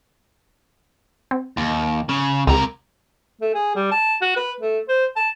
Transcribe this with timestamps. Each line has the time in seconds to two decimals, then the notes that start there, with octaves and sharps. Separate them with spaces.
1.31 C4
1.57 D#2
2.09 C#3
2.47 C#2 C3 A#4
3.41 A3
3.54 G#4
3.76 G3
3.92 A5
4.22 F#4
4.37 B4
4.61 A3
4.89 C5
5.16 A5